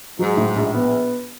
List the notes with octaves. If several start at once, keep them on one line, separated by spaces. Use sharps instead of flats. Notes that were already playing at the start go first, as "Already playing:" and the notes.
G#2 F#3
A2
A#1
B3